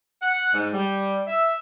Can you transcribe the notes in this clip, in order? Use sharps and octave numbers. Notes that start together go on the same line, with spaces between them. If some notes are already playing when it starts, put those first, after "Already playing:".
F#5
G#2
G3
E5